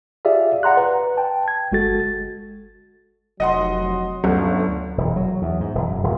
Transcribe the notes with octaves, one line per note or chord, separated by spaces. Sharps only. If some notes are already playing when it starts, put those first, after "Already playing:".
F4 G4 G#4 D5 E5 F5
D5 F#5 A#5 C6 F#6
B4
G5 A5
G#6
G1 G#3 F#4 A4 A6
F1 F#3 D#5 F#5 C6
G1 D2 D3 F#3 C#4 F#5
E1
F#3
E2
G#2
E1
F#2
D#1